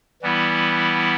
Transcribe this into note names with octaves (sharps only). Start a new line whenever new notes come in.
E3 G3 B3 E4